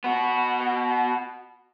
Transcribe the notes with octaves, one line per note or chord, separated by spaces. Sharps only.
B3 F#4